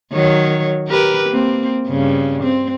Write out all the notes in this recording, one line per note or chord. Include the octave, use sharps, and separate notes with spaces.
D#3 F#3 C#5
G4 A#4 B4
A#3 C4
G2 C#3
C4